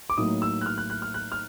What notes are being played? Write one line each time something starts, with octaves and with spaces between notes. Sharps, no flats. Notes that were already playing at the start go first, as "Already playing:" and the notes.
D6
A2 F#3 A#3 D#4 D#6
E6
F#6
F6
F#6
F#6
F6
F#6
F6